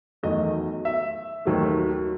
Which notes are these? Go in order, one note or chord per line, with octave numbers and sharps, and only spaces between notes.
E2 D#3 F#3 A3 D#5
E5
D#2 D#3 F#3 A3